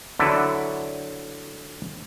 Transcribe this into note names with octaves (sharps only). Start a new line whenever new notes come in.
D3 F#3 E4 A4 B4 D5